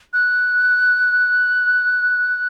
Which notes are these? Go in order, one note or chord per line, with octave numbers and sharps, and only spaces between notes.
F#6